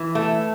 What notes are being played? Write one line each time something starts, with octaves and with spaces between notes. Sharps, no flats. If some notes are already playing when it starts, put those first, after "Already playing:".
Already playing: E3
A3